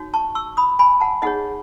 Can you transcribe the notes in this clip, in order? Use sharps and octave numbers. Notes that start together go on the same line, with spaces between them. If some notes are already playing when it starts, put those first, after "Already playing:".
Already playing: D#4 F#4 C#5
A5 C#6
C#6 E6
B5 D#6
G#5 B5
F#5 A5
D#4 G#4 C#5 D#5 F#5